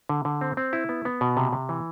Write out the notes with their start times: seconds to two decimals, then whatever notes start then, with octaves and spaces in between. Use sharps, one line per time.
0.09 D3
0.25 D3
0.41 C4
0.57 C4
0.73 E4
0.89 B3
1.05 B3
1.21 B2
1.37 C3
1.53 C3
1.69 E3